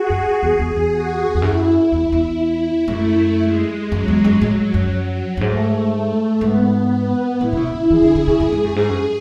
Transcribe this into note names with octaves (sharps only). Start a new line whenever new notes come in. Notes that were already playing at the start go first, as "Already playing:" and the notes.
Already playing: F#4 G#4
F#2
E2
E2
E2
F#4
E2
F#2 E4
E2
E2
G#2
F#2 A3
G#3
F#2 F#3
E2
F#2
A2
F#2
F#3
F#2
G#2 A3
G#2 B3
B3
A2 E4
C#3
B2
C#3
E3 G#4
D3
D3
C#3
F#2 G#4
G#2
F#2
G#2
F#2